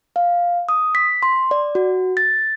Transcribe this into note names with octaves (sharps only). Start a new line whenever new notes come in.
F5
D#6
B6
C6
D5
F#4
A6